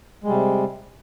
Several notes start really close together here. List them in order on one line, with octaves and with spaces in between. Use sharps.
G#3 G3 C3